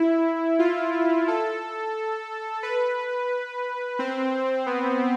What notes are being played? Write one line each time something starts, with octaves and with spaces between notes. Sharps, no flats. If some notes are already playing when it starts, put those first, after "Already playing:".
Already playing: E4
F4
A4
B4
C4
B3